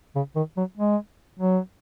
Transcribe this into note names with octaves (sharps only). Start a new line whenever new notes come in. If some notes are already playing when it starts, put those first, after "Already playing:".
C#3
D#3
F#3
G#3
F#3